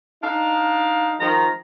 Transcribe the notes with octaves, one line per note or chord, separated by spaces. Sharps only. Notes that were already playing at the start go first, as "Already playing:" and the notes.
D4 D#4 F5
D#3 F3 G#3 A#5